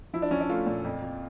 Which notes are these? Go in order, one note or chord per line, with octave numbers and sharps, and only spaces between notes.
F3 E4
D4
F3 C#4
D4
A3 F4
A#2
F2
F2